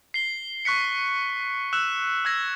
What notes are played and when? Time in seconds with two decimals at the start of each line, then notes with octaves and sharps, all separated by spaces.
0.14 C7 G7
0.65 C#6 F#6 B6 C#7
1.73 E6 F#6 E7
2.25 E6 G#6 A#6